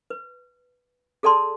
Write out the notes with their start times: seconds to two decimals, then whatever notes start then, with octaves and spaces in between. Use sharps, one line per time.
0.10 B4
1.23 G#4 A4 D5 A5 C6